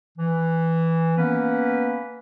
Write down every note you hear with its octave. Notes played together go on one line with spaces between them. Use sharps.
E3
A#3 B3 C#4 B4